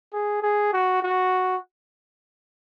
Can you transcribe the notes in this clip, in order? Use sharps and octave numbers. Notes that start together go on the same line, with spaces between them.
G#4
G#4
F#4
F#4